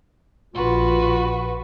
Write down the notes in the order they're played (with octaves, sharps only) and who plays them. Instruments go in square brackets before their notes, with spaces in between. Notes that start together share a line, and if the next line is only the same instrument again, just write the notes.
[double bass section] A#1 [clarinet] F4 [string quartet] F#4 B4